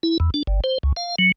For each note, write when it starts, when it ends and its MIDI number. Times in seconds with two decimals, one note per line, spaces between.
0.03 0.18 64
0.20 0.30 40
0.34 0.43 62
0.47 0.60 31
0.64 0.78 72
0.83 0.92 37
0.96 1.15 77
1.19 1.32 54